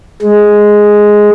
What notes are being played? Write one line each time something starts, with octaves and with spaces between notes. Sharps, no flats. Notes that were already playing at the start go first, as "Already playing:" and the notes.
G#3